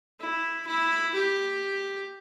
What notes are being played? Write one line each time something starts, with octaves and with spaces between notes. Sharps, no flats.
E4
E4
G4